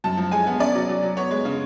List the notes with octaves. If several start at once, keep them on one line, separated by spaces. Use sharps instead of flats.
F#2 A5
F3
G#3 G#5
B3
C#4 D5
F#3
F#3
F#3
B3 C#5
G#3
C#3